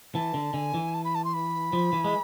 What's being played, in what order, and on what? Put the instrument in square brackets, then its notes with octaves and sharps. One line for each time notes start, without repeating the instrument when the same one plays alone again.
[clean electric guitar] E3 [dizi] A5
[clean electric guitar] D3
[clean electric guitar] D3 [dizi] G#5
[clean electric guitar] E3
[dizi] A5
B5
A5
C6
B5
[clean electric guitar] F3
E3
G#3